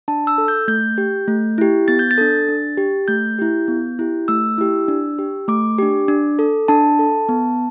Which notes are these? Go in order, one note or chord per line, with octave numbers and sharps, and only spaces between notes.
D4 A5
E6
A4
G6
A3 G6
G4
A3
E4 G4
B3 A6
G6
A6
D4 A4
D4
G4
A3 G6
E4 G4
B3
E4 G4
A3 E6
E4 G4
D4
G4
A3 D6
D4 G4
D4
A4
D4 A5
A4
B3